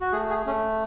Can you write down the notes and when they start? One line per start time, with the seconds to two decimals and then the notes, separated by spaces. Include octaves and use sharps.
0.01 F#4
0.12 A3 G#4
0.29 G#4
0.46 A3 C#4